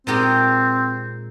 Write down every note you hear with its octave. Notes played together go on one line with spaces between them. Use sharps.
A#2 G#3 C4 D#4 G4 A#4